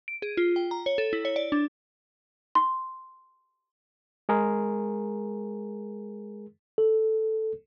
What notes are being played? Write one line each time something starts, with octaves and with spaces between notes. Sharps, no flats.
D7
G#4
F4
G5
A#5
C#5
A4
E4
C#5
D5
D4
C6
G#3 G#4 A#4
A4